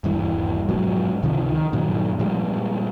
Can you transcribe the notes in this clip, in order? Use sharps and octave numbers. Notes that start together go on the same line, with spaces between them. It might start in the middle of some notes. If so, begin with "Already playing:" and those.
D#1 G2 E3
G#2 B2 F3 F#3
C#2 C3 D#3 F3
D#3
G2 A#2 D#3 F#3
A#2 F3 G3 G#3